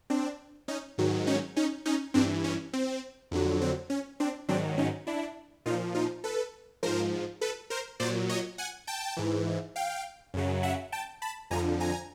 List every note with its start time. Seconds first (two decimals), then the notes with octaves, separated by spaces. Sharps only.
0.10 C4 D4
0.68 C#4 D#4
0.98 G#2 D#3 F#3
1.27 C#4 D#4
1.56 C#4 D#4
1.86 C#4 D#4
2.14 G2 E3 C4 D4
2.44 C#4
2.73 C4
3.31 F2 D3 F#3
3.61 C4
3.90 C#4
4.20 C4 D4
4.49 G#2 D#3 F#3 C4 D4
4.78 C#4 D#4
5.07 D4 E4
5.66 A#2 F3 D#4 F4
5.95 D#4 F4
6.24 A4 B4
6.83 G#2 F3 A#4 C5
7.41 A4 B4
7.70 A#4 C5
8.00 A#2 F#3 C5 D5
8.29 C#5 D#5
8.58 F#5 G#5
8.87 G5 A5
9.17 G#2 E3
9.76 F5 G5
10.34 F#2 C#3 F#3
10.63 E5 F#5
10.92 G5 A5
11.22 A5 B5
11.51 F2 D3 F3 G#5 A#5
11.80 G#5 A#5